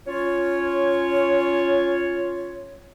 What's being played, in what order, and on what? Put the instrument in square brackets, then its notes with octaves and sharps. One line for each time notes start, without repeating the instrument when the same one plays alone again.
[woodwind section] C#4 F4 C#5